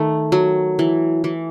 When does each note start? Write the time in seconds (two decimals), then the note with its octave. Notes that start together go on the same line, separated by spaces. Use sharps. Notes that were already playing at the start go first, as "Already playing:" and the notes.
Already playing: D#3 A3
0.32 F#3
0.79 E3
1.24 E3